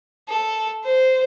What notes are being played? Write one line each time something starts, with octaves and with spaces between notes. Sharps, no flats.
A4
C5